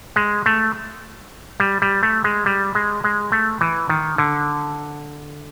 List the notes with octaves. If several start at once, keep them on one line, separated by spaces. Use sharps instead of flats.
G#3
A3
G3
G3
A3
G#3
G3
G#3
G#3
A3
E3
D#3
D3